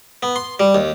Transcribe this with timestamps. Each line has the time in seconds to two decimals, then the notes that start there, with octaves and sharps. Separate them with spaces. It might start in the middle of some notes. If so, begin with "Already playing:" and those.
0.23 B3
0.36 C6
0.60 G3
0.75 D#2